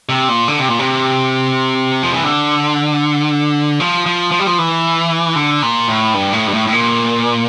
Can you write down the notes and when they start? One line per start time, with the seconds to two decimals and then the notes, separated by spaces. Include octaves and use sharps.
0.09 C3
0.29 A#2
0.48 D3
0.59 C3
0.69 A#2
0.79 C3
2.03 F3
2.13 E3
2.24 D3
3.80 F3
4.06 F3
4.32 F3
4.39 G3
4.47 F3
4.58 E3
5.36 D3
5.62 A#2
5.88 A2
6.14 G2
6.33 A2
6.47 G2
6.54 A2
6.67 A2
6.73 A#2